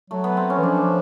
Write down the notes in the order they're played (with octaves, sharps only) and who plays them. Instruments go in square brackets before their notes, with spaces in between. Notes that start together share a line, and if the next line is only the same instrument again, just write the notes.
[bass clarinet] F#3 [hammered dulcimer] A3
[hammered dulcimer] B3
C4
C#4
[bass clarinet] E3
[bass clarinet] F3 [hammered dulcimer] D4